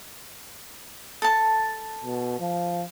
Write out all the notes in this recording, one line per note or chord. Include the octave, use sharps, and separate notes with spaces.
A4 A5
B2
F3